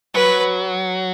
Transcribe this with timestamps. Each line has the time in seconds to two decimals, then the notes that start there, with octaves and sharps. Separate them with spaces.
0.15 F#3 B4